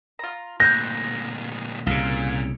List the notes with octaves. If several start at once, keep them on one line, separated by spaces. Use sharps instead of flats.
F4 A#5
D2 A#2 F#6 G6 A#6
C2 A#2 C#3 F5